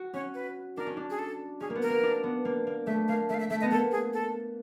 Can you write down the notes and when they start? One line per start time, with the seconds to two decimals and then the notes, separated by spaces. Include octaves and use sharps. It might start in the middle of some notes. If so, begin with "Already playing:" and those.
Already playing: F#4
0.14 C#4 C#5
0.34 B4
0.77 D4 A#4
0.87 C#4
0.97 D4
1.10 G#4
1.19 A4
1.61 C#4 G#4
1.70 A#3
1.75 B3
1.82 A#4
1.90 A#3
2.03 D4
2.23 B3
2.45 A#3
2.67 A#3
2.87 A3 E5
3.08 A#3 F5
3.29 A3 E5 F5
3.40 E5
3.50 A3 E5
3.61 B3 D#5
3.71 A#3 A4
3.92 G#4
4.13 A4